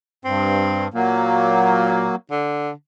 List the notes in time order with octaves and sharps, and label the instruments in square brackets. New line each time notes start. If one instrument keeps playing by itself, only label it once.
[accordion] G2 [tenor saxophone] C4
[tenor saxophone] A#2 [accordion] F#3 A#3
[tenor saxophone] D3